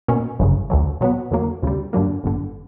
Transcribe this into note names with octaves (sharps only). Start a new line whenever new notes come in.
B2 A#3 C#4
G1 F#2 C#3
D2 D3 F#3
B2 F#3 B3
E2 D3 F#3 A#3
D2 C#3 G3
G2 D3 F#3 A#3
G1 G2 D3